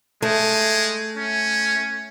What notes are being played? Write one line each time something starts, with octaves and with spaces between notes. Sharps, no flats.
G#3 A3
C#4